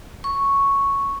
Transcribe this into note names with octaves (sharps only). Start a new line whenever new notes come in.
C#6